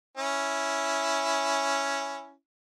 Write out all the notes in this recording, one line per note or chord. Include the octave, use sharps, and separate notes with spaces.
C#4 E4